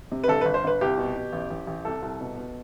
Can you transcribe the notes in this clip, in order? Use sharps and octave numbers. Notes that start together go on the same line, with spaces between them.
C3
B4
G1 A4
G1 B4
C5
G1 B4
C2 G4
B2
B2
A1
A1
A1
C2 A4
C2
B2
B2